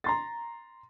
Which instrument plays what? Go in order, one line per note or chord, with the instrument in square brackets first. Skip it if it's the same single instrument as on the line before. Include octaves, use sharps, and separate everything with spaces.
[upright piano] A#5 C6 A6